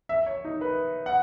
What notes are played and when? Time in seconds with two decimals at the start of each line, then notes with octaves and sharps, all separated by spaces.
0.09 E5
0.26 C#5
0.45 D#4
0.61 B4
1.06 F#5